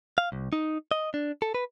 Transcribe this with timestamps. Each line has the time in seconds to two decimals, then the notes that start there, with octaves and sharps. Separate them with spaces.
0.18 F5
0.32 C2
0.53 D#4
0.91 D#5
1.14 D4
1.42 A4
1.54 B4